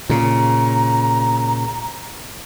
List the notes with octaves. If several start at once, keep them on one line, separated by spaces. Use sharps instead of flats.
A#2 C#3 A#5